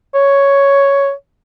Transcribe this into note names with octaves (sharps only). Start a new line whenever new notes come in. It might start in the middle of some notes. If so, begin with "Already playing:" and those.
C#5